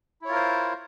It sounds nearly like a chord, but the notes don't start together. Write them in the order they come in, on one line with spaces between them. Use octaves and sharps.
E4 C#5 F4 A#4 C5